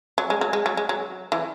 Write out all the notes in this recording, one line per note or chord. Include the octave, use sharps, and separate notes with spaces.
F#3
G#3
F#3
G#3
F#3
G#3
F#3
E3